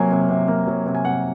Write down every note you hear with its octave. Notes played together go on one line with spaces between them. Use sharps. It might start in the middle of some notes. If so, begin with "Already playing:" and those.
Already playing: C3 F#3 A#3 G#5
C3
C3
A#3
F#3
C3
G#5
C3 F#5